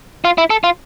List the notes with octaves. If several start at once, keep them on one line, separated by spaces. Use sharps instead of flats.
F4
E4
A4
F4